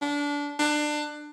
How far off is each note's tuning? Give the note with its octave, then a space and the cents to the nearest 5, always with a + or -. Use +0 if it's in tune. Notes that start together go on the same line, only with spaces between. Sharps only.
D4 -20
D4 +25